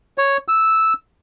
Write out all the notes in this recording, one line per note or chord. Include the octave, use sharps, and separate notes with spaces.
C#5
E6